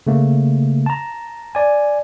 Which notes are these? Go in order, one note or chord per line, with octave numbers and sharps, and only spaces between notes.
C#3 A3 A#3
A5 A#5
D5 G#5